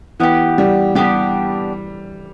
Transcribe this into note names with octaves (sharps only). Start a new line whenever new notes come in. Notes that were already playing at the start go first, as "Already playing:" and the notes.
E3 B3 D4 G4
G3
G3 B3 D4 G4